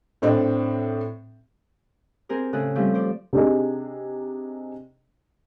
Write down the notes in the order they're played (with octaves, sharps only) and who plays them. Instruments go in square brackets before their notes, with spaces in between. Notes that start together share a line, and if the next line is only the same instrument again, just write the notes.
[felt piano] A2 C4 D4
[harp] C4 G#4 A#4 C5
A2 C#3 G#4 A4 F#6
F3 G3 A3 C4 C#4
C5 D5
[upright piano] C3 D4 D#4 G#4